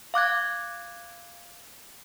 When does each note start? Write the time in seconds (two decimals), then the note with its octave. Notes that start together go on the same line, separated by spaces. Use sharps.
0.14 F5 D6 F#6 G#6